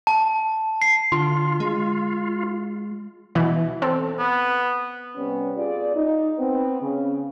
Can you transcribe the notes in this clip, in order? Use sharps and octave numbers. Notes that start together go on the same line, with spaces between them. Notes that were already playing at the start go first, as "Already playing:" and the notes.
A5
C7
D3 F4 C6
G#3
B2 E3
C4 A4
B3
C3 G3 B3 C#4
F4 G#4 D5
D#4
B3 C4
C#3